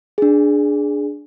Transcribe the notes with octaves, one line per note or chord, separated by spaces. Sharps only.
D4 G#4